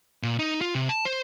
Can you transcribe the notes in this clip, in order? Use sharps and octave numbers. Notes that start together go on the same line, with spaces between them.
A#2
D#4
F4
C3
A5
C5